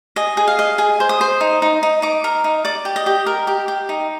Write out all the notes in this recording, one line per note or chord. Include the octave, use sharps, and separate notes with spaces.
D#5 G#5
G#4
F5
D#5
G#4 G#5
C5
D#6
C5
D#4
D#4
D#4
D#4 D6
A#4
D#4
D5 D6
G4
D#5
G4
A#4
G4
G4
D#4